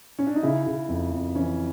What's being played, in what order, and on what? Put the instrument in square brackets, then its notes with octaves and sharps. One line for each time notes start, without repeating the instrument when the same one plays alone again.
[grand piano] C#4
D4
D#4
C#3 E4
C#3
F2
F2
E3 C#4